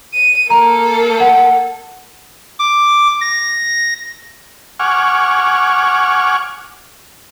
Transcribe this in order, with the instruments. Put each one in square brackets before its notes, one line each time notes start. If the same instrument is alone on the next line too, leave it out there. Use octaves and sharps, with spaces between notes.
[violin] D#7
[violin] A#3 A4 [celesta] A#5
[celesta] F#5
[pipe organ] D6
A#6
[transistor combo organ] F#5 G#5 C#6 D6 F6